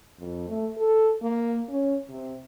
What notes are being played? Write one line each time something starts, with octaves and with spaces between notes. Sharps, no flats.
F2
A3
A4
A#3
C#4
C3